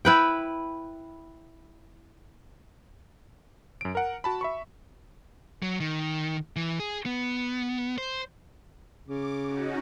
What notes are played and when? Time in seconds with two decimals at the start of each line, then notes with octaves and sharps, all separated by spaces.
0.05 E4 B4 G5
3.81 F#2 D7
3.95 A#4 F#5
4.24 F#4 A5 B5
4.41 E5 B5 C#6
5.62 F#3
5.80 D#3
6.56 E3
6.79 G#4
7.06 B3
7.98 C5
9.08 C#3 D6
9.47 C#4 D#4 F#4